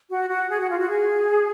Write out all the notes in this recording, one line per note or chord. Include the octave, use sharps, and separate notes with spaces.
F#4
F#4
G#4
F#4
F4
F#4
G#4